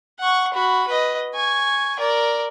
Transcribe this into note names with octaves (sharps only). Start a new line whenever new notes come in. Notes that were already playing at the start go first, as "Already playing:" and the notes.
F#5 C#6
F#4 B5
B4 D#5
G#5 C#6
A#4 D5